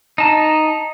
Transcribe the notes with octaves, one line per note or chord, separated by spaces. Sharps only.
D#4 A5